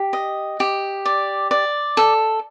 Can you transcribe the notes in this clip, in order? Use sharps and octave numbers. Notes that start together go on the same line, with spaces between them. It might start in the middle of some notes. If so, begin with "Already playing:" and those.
Already playing: G4
D#5
G4
D5
D5
A4